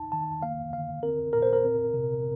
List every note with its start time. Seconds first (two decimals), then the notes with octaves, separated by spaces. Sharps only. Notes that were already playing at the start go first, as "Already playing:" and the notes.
Already playing: D#4 A5
0.12 D#3 A5
0.42 A#3 F5
0.73 D3 F5
1.03 C4 A#4
1.33 A#2 A#4
1.42 C5
1.53 A#4
1.64 C4
1.94 C3